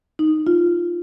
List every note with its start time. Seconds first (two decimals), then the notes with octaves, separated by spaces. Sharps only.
0.19 D#4
0.47 F4